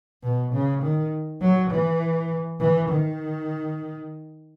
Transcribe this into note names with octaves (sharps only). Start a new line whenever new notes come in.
B2
C#3
D#3
F#3
E3
E3
D#3